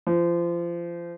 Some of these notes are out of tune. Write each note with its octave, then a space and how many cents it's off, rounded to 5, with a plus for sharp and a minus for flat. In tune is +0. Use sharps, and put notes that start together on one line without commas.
F3 -30